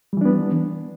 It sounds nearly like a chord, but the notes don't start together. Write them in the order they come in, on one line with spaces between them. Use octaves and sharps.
G3 E3 D4 B3